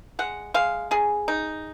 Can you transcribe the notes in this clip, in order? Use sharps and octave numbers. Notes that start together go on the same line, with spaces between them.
G#3 F#5
G#3 F5
C#3 G#4
D#4